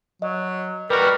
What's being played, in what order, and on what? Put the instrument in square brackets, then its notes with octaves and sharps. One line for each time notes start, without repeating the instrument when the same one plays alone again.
[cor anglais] F#3 [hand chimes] D#5
[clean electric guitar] G3 F#4 [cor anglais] A#4 [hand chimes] B4